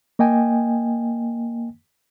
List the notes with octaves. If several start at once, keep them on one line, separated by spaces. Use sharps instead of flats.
A#3 D#5 G5 G#5